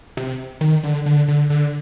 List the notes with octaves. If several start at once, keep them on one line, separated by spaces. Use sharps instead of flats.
C3
D#3
D3
D3
D3
D3